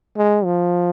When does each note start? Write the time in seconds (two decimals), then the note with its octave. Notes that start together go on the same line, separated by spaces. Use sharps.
0.17 G#3
0.45 F3